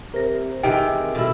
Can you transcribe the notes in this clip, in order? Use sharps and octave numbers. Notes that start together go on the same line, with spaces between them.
C3 A#4 A#6
C3 D#3 E3 G#3 G5
B2 A3 E4